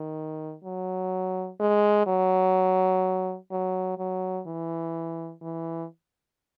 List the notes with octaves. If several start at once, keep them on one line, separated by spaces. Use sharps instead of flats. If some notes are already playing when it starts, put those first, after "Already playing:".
Already playing: D#3
F#3
G#3
F#3
F#3
F#3
E3
E3